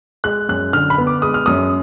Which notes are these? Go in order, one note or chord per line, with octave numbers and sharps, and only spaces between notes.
G#3 F#6
F#2 F#6
D3 F6
B5
B3
D6
G#3 D#6
F6
F#2 D#6